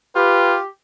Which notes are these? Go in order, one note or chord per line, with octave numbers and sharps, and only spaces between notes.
F4 G4 B4